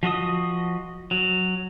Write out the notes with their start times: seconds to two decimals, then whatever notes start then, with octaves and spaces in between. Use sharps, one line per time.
0.03 F3 F#4 D#5 D#6
1.11 F#3